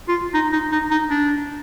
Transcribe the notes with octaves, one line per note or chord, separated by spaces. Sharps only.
F4
D#4
D#4
D#4
D#4
D4